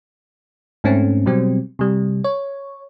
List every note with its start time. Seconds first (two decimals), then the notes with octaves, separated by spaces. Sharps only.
0.84 G#2 A3 C4 C#4
1.26 B2 F#3 G3 C4
1.79 C3 G3
2.24 C#5